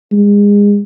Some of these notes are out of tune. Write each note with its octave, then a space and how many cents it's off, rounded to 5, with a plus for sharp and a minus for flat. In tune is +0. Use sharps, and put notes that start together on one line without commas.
G#3 -30